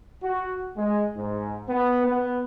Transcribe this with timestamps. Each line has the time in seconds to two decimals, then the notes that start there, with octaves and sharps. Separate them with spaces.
0.22 F#4
0.77 G#3
1.15 G#2
1.69 B3
2.04 B3